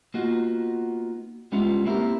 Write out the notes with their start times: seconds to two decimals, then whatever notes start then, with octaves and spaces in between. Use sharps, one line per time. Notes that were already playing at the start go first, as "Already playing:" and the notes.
0.14 A#3 B3 D#4 F4 F#4
1.52 G3 G#3 B3 C#4 E4 F4
1.85 A#3 C4 E4 F4 G4 A#4